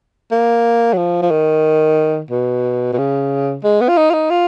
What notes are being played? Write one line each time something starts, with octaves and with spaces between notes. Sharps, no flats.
A#3
F#3
F3
F3
D#3
B2
B2
C#3
G#3
B3
F4
D#4
F4
D#4
F4